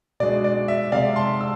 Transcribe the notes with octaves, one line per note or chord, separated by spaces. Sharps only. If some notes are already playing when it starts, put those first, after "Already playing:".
B2 G#3 D4 D5
D5
E5
C3 G#3 C4 D5 F5
A5 C6
E6